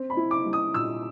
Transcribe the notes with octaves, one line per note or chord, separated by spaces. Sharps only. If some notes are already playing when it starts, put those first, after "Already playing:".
Already playing: C4
B5
E4
D6
G3
D#6
A#2 E6